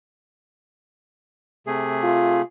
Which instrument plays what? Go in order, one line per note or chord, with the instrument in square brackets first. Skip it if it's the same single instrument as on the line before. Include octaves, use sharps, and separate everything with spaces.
[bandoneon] C3 A3 G#4
[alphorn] F4